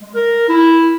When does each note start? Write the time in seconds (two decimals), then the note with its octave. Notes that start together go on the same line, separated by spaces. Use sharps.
0.01 G#3
0.15 A#4
0.48 E4